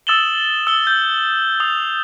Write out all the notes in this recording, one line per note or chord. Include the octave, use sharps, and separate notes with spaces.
D#6 E6 A6 E7 F#7 G7
E6 E7 G7
G6
D#6 F7